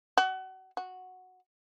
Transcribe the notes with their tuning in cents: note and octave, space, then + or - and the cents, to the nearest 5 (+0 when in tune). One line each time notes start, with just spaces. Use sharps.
F#4 +30
F#4 -5